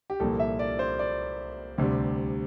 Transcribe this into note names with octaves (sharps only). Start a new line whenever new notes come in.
G4
C2 A#2 F3 A#3 A4
E5
D5
C5
D5
D2 C3 G3